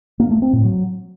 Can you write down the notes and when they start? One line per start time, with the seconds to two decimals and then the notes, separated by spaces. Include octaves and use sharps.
0.20 A#3
0.31 A3
0.42 C4
0.53 A2
0.64 F#3